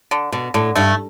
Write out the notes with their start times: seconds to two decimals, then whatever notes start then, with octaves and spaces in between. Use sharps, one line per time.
0.11 D3
0.32 B2 D3
0.54 A2 D3
0.76 G2 A3